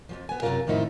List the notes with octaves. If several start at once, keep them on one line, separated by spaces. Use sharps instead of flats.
F2 G#2 F3
B3 G#5
F#2 C3 F3 F4 A#4 F5
F2 A2 D#3 F3 D#4 E4